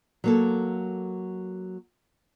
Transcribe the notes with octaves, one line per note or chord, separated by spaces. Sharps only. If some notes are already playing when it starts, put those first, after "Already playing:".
F#3 A#3 A4